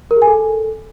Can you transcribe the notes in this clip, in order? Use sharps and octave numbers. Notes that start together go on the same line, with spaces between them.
A#4
G#4
G#5
A4